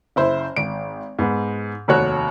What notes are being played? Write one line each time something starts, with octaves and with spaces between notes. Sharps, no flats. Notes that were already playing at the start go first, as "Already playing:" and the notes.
F#1 E4 C5
G#1 D7
G#2 B3
F1 D#2 F#4 C#5 F#6